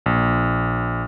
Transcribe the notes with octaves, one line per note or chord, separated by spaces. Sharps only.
A#1